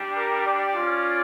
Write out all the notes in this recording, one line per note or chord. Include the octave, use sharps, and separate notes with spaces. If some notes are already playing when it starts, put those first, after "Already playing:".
Already playing: G3 D4 G4
A#4
D5
C#4 F4